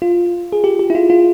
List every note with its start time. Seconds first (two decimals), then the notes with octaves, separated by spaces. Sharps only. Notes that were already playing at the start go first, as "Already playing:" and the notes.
0.02 F4
0.52 G#4
0.64 G4
0.79 G4
0.90 E4
0.95 F4
1.10 F4